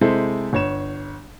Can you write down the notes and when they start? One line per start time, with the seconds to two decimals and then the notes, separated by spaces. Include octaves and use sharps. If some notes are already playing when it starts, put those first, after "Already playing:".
0.01 C3 G#3 E4 A4 C5
0.53 G1 C#5 E7